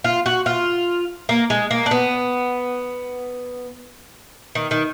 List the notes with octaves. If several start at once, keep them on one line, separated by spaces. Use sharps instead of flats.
F4
F#4
F4
A#3
G#3
A#3
D4
B3
D#3
D#3